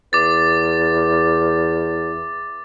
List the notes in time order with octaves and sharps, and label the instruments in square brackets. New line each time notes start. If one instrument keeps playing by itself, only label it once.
[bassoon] E2 [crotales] D6 A6